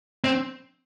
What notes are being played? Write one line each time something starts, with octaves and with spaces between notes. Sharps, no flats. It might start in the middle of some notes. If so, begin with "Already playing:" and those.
C4